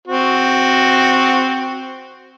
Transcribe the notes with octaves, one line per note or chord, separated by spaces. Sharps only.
C4 F#4